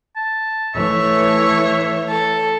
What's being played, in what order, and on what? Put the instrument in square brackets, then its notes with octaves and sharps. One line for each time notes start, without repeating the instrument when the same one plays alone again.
[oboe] A5
[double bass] E3 A3 [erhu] C#5 [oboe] E5
[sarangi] A4